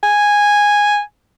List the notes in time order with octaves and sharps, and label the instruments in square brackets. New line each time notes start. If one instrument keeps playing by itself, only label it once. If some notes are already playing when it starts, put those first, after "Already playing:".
[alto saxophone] G#5